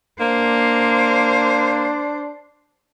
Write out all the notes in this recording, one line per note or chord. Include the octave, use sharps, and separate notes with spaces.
A#3 D4 C5